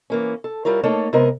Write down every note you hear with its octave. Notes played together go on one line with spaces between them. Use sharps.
E3 A#3 C#4
A4
G3 E4 F4 A#4 C#5
A3 A#3 D#4 A4 C#5
C3 G#3 B3 A#4 D#5